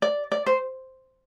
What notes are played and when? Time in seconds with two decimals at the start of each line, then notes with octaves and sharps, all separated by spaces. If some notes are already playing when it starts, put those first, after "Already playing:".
0.02 D5
0.32 D5
0.46 C5